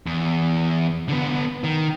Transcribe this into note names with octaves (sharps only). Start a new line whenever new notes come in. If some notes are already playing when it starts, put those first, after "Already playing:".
E2
D3 B3
D#3